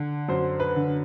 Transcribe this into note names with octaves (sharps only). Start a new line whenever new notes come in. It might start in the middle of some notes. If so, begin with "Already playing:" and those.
Already playing: D3
F#2 C5
B4
D3